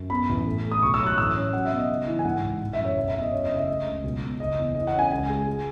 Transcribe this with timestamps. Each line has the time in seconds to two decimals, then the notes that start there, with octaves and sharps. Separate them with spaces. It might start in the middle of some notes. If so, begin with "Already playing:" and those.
Already playing: F#2
0.10 B3 B5
0.29 A1
0.47 A3
0.64 A3
0.72 D#6
0.82 B1 C#6
0.94 E6
1.00 F#3
1.06 F#6
1.18 A1 E6
1.35 C#4
1.53 F#3 F#5
1.65 E5
1.72 B2
1.77 D#5
1.90 C#3
2.07 E3
2.19 G#5
2.24 G#2 F#5
2.42 A1
2.61 E3
2.73 E5
2.79 F#2
2.85 C#5
2.97 E1 E5
3.08 E5
3.15 E2
3.21 D#5
3.32 F#2 C#5
3.44 D#5
3.50 C#3
3.56 E5
3.68 A3 D#5
3.86 C#2
4.03 B1
4.21 B2
4.39 F#1 D#5
4.58 E2
4.75 E3 D#5
4.87 F#5
4.93 C#4
4.99 G#5
5.11 C#2 G#5
5.29 G#3
5.46 G#3